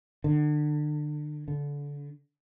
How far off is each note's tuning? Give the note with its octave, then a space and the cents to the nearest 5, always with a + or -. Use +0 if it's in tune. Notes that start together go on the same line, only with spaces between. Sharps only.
D3 +30
D3 -30